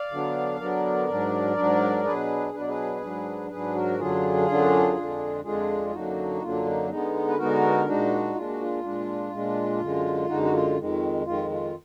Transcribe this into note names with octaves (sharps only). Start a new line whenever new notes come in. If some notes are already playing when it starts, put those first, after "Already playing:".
Already playing: D5 F5
D3 F#3 B3 D4
D3 F#3 B3 D4 A#4 D5
G#2 F#3 D4
G#2 F#3 D4
B2 F#3 D4 G#4 B4
B2 F#3 D4 B4
D5
G#4 B4
G#2 F#3 D4
G#2 F#3 D4 G#4 B4
F#4 A#4
F#2 D3 F#3 D4 F4 G#4
F#2 D3 F#3 D4
F2 D3 G#3 D4
F2 D3 G#3 D4 F4 G#4
G#4
F#2 D3 F#3 A#3 D4 D#4 F#4
F#2 D3 F#3 A#3 D4 F4
D#4
D3 G#3 B3 D#4
B4
D3 G#3 B3 D#4 F#4 A#4
A#2 G#3 D4 D#4 F#4
A#2 G#3 D4 F4
F#4
F4
A#2 G#3 D4
A#2 G#3 D4
F#2 D3 G#3
F#2 D3 G#3 D#4 F#4
F#4
F4
F2 D#3 G#3
F2 D#3 G#3 F4
F4